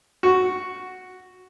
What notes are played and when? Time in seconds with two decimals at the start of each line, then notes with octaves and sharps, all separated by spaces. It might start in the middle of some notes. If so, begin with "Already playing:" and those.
0.23 F#4